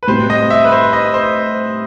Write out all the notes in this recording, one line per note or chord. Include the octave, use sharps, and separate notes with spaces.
B4
A2 G3 C4 C5
D#5
E5
B4
C5
D#5
C5